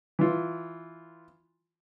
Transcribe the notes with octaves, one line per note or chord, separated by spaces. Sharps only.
E3 F4